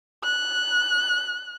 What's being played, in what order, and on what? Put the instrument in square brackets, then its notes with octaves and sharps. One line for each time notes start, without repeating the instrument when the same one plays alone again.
[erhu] F#6